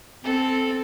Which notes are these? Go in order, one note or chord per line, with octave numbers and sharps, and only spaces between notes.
C4 A4